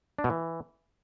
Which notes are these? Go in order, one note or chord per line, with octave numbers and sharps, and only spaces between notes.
D4
B2
E3